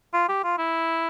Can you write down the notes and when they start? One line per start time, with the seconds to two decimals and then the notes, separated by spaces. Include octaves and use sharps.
0.13 F4
0.28 G4
0.44 F4
0.58 E4